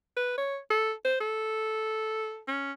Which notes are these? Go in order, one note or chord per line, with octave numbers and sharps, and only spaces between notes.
B4
C#5
A4
C5
A4
C#4